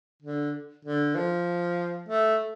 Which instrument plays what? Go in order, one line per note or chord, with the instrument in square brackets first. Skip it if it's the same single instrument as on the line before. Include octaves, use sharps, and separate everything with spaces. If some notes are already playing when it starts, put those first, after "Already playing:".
[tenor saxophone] D3
D3
F3
A3